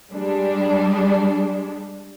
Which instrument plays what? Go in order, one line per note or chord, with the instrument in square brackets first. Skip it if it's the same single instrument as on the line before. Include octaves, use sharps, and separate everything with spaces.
[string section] G3 G#3 D4